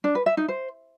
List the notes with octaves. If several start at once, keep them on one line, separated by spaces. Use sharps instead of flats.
D4
B4
E5
D#4
C5